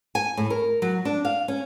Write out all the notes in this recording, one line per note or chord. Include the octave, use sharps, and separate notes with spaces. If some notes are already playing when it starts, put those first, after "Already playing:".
G#5
A2
A#4
F#3
D4
F5
C#4